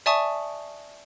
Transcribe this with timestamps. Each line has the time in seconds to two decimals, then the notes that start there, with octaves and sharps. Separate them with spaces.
0.06 D5 E5 G#5 A5 C#6 D#6